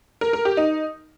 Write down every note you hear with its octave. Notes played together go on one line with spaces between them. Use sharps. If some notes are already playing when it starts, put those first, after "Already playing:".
A#4
A#4
G4
D#4